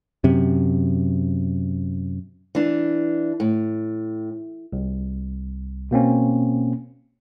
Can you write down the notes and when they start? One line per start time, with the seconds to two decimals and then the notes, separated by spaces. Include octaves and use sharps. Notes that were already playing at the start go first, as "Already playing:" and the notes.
0.24 F#2 C3
2.55 E3 D4
3.40 A2
4.73 C2
5.91 B2 A#3 C4 C#4